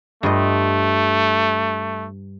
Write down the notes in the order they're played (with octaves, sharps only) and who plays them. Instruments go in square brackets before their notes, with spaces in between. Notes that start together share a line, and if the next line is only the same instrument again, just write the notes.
[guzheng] G2 F4 D#5 [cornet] A3